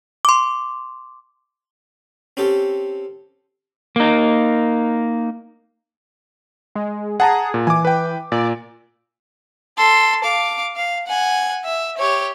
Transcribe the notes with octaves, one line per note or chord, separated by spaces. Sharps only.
C6 D6
C4 C#4 G4 A4
A#3 D#4
G#3
G#4 F#5 A5 A#5
A#2
E3 G#5 D6
B4 G5
A#2 D5
A4 C6
F5 D6
F5
F#5 G#5
E5
G4 C#5